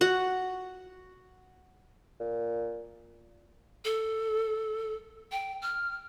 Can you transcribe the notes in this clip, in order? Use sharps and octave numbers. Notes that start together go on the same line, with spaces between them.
F#4 F#5
A#2
A4
G5
F6